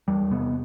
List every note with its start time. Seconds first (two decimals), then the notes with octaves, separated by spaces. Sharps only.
0.08 E2 G3
0.31 C3 B3